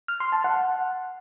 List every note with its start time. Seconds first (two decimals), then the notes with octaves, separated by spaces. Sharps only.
0.08 F6
0.20 C6
0.32 A5
0.44 F#5